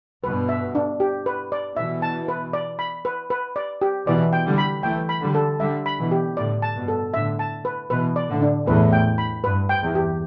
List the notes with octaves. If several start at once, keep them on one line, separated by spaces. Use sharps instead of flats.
G2 B2 B4
E5
D4
G4
B4
D5
B2 E3 E5
A5
B4
D5
B5
B4
B4
D5
G4
B2 E3 D5
G5
D3 G3
B5
E3 A3 G5
B5
D3 G3
A4
D3 G3 E5
B5
B2 E3
G4
A2 D3 D5
A5
G2 B2
A4
A2 D3 E5
A5
B4
B2 E3 B4
D5
A2 D3
D4
E2 A2 B4
G5
B5
G2 B4
G5
E2
G4